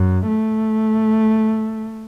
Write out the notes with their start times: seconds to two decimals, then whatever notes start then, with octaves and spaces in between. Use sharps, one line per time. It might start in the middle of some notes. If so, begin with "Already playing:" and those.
Already playing: F#2
0.27 A3